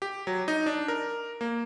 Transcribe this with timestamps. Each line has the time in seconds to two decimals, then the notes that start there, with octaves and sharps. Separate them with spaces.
0.02 G4
0.27 F#3
0.48 D#4
0.66 D4
0.88 A#4
1.41 A#3